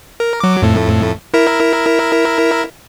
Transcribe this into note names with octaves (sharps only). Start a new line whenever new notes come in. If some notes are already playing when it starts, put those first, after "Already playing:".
A#4
F#3 D6
F2 A2 A3
E4 A#4 E5